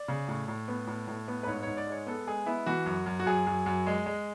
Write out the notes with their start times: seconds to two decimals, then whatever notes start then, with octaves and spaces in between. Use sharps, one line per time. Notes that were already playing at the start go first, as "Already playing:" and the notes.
Already playing: D5
0.08 C#3
0.28 A2
0.48 A2
0.68 B3
0.87 A2
1.08 A2
1.28 B3
1.43 B4
1.47 G#2 C#5
1.62 G#2 C#5
1.77 D5
1.87 G#3 C#5
2.07 B3 A4
2.27 G#3 G#4
2.46 B3 E4
2.66 E3 F#4
2.86 F#2
3.06 F#2
3.20 F#4
3.26 F#2 G#4
3.47 F#2
3.66 F#2
3.86 G#3
4.06 G#3